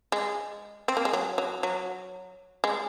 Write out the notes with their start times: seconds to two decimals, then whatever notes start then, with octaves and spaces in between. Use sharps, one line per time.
0.12 G#3
0.88 C4
0.97 A#3
1.05 G#3
1.13 F#3
1.38 F#3
1.63 F#3
2.64 G#3